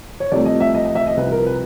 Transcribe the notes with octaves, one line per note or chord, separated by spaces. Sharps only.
C#5
C2 C3 F3 A3 D5
D#5
E5
D#5
D#5
E5
D#5
C2 C3 F3 B4
A#4
B4